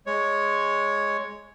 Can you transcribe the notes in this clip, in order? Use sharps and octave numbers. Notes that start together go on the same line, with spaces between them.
G#3 C#5